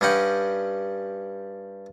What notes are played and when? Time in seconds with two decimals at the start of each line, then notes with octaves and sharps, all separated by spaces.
0.01 G2 G3 C#4 D#5 F#5 G5